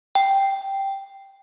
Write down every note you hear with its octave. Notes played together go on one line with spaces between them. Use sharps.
G5